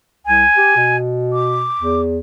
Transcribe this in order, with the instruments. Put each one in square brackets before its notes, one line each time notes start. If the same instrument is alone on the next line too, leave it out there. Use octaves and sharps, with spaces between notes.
[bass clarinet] C2 [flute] G#5
[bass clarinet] G4
B2
[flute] D6
[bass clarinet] E2